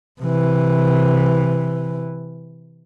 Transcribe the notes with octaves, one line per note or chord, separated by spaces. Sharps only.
C3 E3